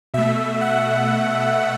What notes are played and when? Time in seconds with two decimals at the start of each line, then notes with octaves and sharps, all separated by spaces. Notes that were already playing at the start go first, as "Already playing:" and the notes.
0.14 B2 A3 E5
0.61 F#5